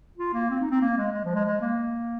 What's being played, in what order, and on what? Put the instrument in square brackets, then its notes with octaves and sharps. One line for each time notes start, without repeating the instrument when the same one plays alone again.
[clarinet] F4
A#3
C4
D#4
C4
A#3
G#3
G#3
F3
G#3
G#3
A#3